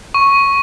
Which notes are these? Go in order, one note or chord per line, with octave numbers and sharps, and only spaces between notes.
C#6